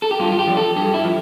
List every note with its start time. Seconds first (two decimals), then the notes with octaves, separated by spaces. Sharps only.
0.02 A4
0.11 G4
0.20 G2 F4
0.32 F4
0.39 G4
0.47 F3
0.57 A4
0.76 G2 G4
0.94 E4
1.04 F3